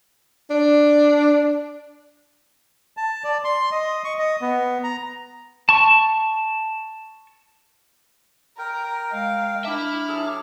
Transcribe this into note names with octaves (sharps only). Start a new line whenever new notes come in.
D4
A5
D5
C6
D#5
C#6
D#5
B3
A#5
A5 C#6
A#4 G5 A#5
G#3 F5
D4 E4 E5 D6 F6
F#3 G#4 A4